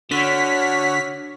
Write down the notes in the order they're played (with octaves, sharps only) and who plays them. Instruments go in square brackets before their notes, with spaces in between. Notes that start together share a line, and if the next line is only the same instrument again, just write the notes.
[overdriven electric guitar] D3 [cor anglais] F#4 [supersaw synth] C#5 F#5 F6 [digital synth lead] B6